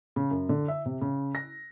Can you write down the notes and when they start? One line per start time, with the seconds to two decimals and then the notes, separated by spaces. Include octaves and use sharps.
0.16 C#3
0.31 F#2
0.49 D3
0.68 E5
0.86 C3
1.01 C#3
1.35 A#6